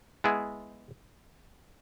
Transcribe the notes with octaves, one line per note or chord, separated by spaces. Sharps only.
G#3 B3 E4 G#4